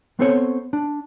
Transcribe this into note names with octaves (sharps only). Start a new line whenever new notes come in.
B3 C4 A4 C5 C#5
D4